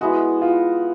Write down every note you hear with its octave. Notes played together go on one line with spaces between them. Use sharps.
G#3 B3 E4 F#4
F4